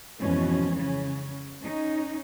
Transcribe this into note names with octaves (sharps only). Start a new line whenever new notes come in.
F2 G#2 B2 E3 C#4
C#3 C#4
C#4 D#4